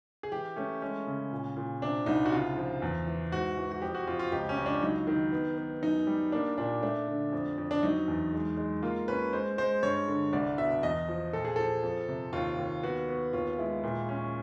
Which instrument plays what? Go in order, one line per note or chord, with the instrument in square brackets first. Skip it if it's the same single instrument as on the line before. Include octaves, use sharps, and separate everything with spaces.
[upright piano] G#4
E3 G4
A3 C#4
G#3 C#4
C#3
A#2
A#2
C3 D4
C2 D#4
F#4
C#3 F4
F3
E2
E3
G#2 F#4
E3
F#4
F2 G4
F#4
F2 F4
F4
C#2 G4
C#4
C#2
D4
F#3 D#4
D#3
B3
B3
F#2 D#4
G3
A#3 D4
A#2 D4
A3 D4
D3
F2
F2
D4
F#3 D#4
E2
G#3
G#3
A#3 F4
C#4 B4
G#3 C5
G#3 C5
G2 C#5
D3
C2 D5
B2 E5
E2 D#5
F3
A#2 A4
G#4
F3 A4
F2
C3
D#2 F4
D#2
B3 F#4
B3
D#2 F4
G#3 E4
A#2
C#4